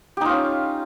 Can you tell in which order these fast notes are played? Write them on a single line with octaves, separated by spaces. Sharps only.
G4 D#4 F4 C#4